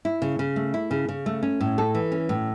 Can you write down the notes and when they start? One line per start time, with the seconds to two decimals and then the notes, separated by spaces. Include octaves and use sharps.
0.05 E4
0.22 C#3
0.39 C#3
0.56 A3
0.74 E4
0.91 C#3
1.09 C#3
1.26 A3
1.43 C#4
1.61 A2
1.78 A4
1.95 E3
2.12 C#4
2.29 A2